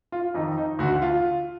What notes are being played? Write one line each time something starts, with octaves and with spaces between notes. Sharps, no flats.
F4
F2 D#3 D#4
D#4
D2 D3 F#4
F4